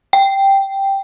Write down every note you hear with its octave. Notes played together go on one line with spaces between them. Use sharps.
G5